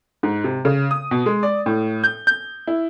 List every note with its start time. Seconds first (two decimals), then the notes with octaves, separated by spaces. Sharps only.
0.23 G#2
0.44 C3
0.65 C#3
0.91 D#6
1.11 B2
1.26 G#3
1.43 D5
1.66 A2
2.04 G6
2.27 G6
2.67 E4